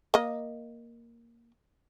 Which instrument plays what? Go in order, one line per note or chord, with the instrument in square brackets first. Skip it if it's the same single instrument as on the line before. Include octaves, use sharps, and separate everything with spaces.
[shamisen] A#3 D#5